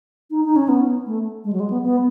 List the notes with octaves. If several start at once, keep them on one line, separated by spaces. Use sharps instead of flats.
D#4
D#4
C#4
B3
A3
G#3
F#3
G#3
B3
B3